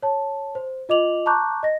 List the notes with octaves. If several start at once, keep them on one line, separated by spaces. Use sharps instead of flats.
C#5 A5
C5
F4 D#5 D6 F7 F#7
A5 A#5 C#6 D6 F#6 G6
D#5 A#6